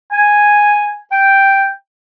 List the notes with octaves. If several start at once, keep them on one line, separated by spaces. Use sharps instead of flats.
G#5
G5